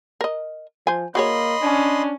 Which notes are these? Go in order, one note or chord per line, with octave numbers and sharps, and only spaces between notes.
A#4 D#5
F3 C5 G#5
A#3 F#4 G#4 C#5 D#5 B5 C6
C#4 D4